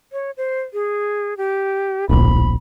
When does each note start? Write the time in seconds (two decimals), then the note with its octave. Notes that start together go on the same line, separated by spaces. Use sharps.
0.12 C#5
0.37 C5
0.73 G#4
1.37 G4
2.09 D1 A#1 B5